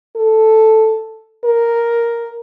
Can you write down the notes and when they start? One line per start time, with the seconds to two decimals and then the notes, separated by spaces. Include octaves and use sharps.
0.16 A4
1.45 A#4